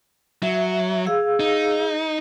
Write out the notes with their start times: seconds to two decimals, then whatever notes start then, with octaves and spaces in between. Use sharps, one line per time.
0.43 F#3 E5
1.06 G#4 F5 E6
1.40 D#4